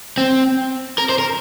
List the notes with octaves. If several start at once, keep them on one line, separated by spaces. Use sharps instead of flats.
C4
A#4
C5
A#4